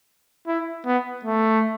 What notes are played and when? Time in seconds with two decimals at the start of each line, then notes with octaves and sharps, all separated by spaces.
0.47 E4
0.86 B3
1.25 A3